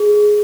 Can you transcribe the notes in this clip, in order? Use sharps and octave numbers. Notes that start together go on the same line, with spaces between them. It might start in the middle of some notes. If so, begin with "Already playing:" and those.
Already playing: G#4